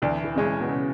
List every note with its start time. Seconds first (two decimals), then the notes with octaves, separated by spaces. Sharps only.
0.02 D2 E3
0.24 E3
0.36 C#3 G#3 C#4
0.61 B2
0.69 C#3